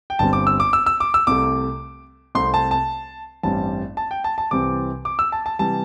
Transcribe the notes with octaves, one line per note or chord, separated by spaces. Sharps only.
G5
G1 G2 G3 C4 A5
D6
E6
D6
E6
E6
D6
E6
C2 C3 A3 D6
C2 C3 A3 C4 C6
A5
A5
A1 G2 G3 C4 A5
A5
G5
A5
A5
C2 C3 E3 G3 C4 D6
D6
E6
A5
A5
C3 E3 G3 A5